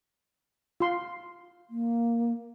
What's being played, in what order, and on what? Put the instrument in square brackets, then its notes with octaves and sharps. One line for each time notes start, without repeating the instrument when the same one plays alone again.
[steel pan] F4 C6
[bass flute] A#3